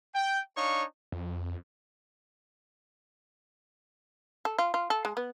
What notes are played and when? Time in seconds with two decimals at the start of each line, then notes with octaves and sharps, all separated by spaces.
0.15 G5
0.57 D4 D#4 C#5 F5 C#6
1.12 F2
4.45 A4
4.59 F4
4.74 F4
4.90 A4
5.05 G#3
5.17 B3